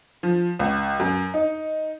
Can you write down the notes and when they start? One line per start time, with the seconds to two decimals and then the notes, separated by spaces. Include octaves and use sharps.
0.23 F3
0.59 C#2
1.00 F#2
1.34 D#4